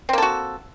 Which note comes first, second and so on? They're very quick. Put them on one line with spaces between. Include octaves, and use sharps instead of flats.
C4 A#3 A4 F#4